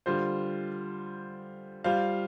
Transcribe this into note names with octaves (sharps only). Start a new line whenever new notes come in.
D3 G3 F4 C5
G3 F4 C5 F5